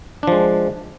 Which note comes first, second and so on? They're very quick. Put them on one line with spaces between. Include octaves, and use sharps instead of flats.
D4 F3 G#3